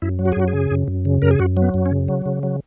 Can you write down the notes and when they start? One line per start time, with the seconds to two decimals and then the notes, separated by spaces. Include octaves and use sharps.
0.02 F#2 E4
0.19 F#3
0.25 F#4
0.32 G#4
0.36 F#2 F#4
0.48 G#4
0.54 C#3
0.71 F#2
0.88 F#2
1.05 C#3
1.22 F#2 A#4
1.31 G#4
1.39 F#2 F#4
1.57 F#3
1.62 B3
1.74 F#2
1.86 C#4
1.91 C#3
2.08 F#3
2.26 C#3
2.43 F#3